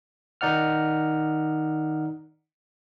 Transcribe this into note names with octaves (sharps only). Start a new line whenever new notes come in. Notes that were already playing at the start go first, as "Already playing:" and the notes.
D#3 D#4 D5 F#5 F6